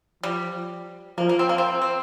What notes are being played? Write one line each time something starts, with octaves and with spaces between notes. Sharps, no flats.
F3 G3
F3 A#3
A#3
C4
A#3
C4
C4